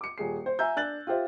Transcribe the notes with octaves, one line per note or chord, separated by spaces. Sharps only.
D6 C#7
D#1 G#4 C7
C5
E5 G#5 A#5 E6 G6
D4 F#6 A6 F#7
F4 G4 C5 E5